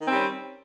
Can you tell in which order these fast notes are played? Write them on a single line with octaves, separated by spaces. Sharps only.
D#3 C4 G3 C#4